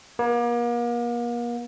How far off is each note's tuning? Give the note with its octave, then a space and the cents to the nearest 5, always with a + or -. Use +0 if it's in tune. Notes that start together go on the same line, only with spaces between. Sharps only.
A#3 +40